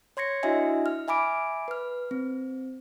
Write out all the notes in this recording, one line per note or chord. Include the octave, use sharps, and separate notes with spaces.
C#5 C6 G#6 A#6 C#7
D4 E4 F#4 D#5 E5 G#5
F6
E5 G#5 B5 D6 D7
B4 F6
C4